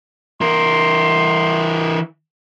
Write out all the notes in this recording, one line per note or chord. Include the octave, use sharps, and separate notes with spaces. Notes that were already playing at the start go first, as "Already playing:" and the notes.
E3 A#4 C6